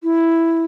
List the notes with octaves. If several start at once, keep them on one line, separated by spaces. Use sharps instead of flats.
E4